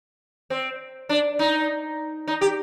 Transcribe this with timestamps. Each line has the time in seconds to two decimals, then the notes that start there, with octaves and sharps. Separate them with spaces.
0.50 C4
1.09 D4
1.39 D#4
2.28 D#4
2.41 G4